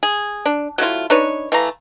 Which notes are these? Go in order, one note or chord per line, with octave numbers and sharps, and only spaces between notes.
G#4
D4
F#3 A3 E4 F4
D4 D#4 B4 C#5
E3 A3 F5 A#5